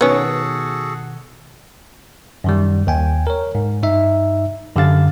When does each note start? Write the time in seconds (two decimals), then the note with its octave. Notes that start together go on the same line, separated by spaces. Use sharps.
0.01 B2 D#3 B3 C#4 F#4 G#4 A4
2.44 F#2 D#3 G3
2.87 D#2 G5 G#5
3.27 A#4 C#5
3.55 G#2
3.83 G2 D#4 E5
4.75 F#2 D3 G4 F5 A6